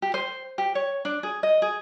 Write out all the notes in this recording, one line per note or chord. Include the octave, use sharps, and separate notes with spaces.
G4
C5
G4
C#5
D4
G#4
D#5
G#4